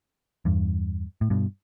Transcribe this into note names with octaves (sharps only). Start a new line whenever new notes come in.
E2 G2
A2
G2 B2